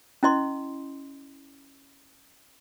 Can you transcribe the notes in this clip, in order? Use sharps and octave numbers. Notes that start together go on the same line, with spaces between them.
C#4 E4 D#5 C6